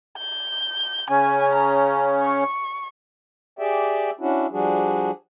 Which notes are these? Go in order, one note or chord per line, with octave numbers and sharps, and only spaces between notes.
G6
C#3 C#4 G#5
A#5
C#6
G4 G#4 D5 E5 G5
C#4 D4 E4 F#4
F3 G3 D4 F#4 G#4